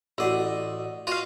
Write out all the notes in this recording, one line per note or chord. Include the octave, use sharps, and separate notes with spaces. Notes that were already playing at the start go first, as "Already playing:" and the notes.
A1 F#4 D5 D#5 F#5 E6
F4 F#4 D#5 F5